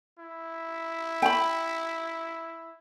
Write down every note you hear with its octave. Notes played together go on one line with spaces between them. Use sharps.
E4
G5 B5